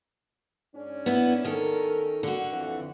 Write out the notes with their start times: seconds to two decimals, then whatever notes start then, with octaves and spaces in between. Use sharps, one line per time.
0.74 G#2 C#4 D4
1.06 B3 E4
1.45 D#3 C#4 A4 A#4
2.23 D3 F#4
2.52 F2 E3